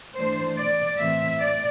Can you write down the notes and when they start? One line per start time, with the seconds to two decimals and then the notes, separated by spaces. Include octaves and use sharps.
0.17 E3 A3 D4 C5
0.58 D5
0.99 A2 E3 A3 C4 E5
1.40 D5